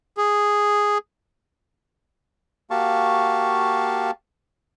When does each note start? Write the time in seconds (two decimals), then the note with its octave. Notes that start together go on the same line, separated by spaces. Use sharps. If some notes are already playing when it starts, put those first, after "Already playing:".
0.18 G#4
2.71 A#3 F#4 G4 F5 A5 C#6